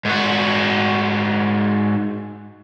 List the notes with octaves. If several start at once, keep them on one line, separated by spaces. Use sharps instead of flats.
G#2 F#4